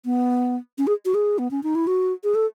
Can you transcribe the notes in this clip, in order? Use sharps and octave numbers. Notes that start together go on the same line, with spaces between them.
B3
C#4
G#4
F#4
G#4
B3
C#4
D#4
E4
F#4
G#4
A4